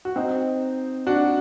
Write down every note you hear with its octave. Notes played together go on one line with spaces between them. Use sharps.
F#4
C4 D#4
D4 F#4